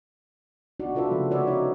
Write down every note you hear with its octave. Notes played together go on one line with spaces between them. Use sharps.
D4 D#4 F#4 D5
C3 F4 A4 B4 E5
C#3 F3 G#3 A#3
F#4 B4 C#5 D5 E5
C#4 D#4 C#5